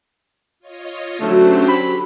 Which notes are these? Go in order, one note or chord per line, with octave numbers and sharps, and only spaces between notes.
F4 C#5 D#5
D3 F#3 A3 C#4 G4 C5
B5